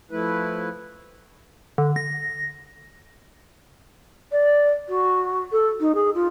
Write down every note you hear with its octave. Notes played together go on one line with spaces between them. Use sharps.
F3 A3 E4 B4
D3
A#6
D5
F#4
A4
D#4
G#4
F4